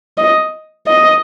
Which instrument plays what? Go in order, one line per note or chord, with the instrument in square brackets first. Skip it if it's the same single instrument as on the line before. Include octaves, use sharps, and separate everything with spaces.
[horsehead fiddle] D#5
D#5